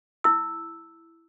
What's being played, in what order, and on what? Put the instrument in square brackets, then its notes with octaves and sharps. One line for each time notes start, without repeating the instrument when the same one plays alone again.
[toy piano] E4 E6